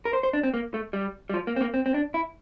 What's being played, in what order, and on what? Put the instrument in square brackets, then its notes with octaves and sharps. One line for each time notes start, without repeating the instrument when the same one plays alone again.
[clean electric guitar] A#4
C5
C5
D4
C4
A#3
A3
G3
G3
F3
A#3
C4
A#3
C4
C4
D4
E4